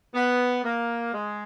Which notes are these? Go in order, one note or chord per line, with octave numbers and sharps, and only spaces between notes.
B3
A#3
G#3